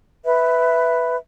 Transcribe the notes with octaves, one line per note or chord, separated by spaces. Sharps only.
B4 E5